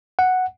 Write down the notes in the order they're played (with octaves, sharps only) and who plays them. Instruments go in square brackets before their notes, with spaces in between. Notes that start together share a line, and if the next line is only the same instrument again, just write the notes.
[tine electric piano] F#5